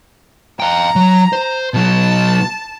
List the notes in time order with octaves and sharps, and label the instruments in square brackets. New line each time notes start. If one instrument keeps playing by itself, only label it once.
[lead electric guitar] F5 G5 [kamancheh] A#5
[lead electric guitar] F#3
C5
[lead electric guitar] B2 F#3 [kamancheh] A5